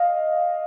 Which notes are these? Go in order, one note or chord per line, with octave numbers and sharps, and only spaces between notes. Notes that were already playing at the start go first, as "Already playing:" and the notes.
Already playing: D#5 F5